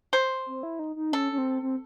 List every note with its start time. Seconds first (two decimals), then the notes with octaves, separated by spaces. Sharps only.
0.13 C5
0.46 C4
0.63 E4
0.79 D#4
0.96 D#4
1.13 C#4 A4
1.32 C#4
1.38 C4
1.62 C4